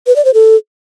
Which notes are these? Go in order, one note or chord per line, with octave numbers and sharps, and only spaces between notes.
B4
D5
C5
A4